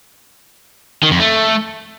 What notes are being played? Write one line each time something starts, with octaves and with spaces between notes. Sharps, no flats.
D#3
F2
A3